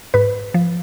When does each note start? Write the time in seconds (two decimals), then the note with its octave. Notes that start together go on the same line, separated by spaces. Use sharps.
0.14 G#2 B4
0.54 F3